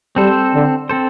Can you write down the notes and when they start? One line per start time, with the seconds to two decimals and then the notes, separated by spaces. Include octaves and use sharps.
0.16 G3 C4 A4 C5
0.53 D3
0.89 C4 A4 C5